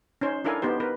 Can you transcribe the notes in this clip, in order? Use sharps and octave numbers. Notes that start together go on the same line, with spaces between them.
C#4 D#4 C5
D4 E4 A4 A#4 F5 G#5
B3 D#4 G4 C5
A#4 B4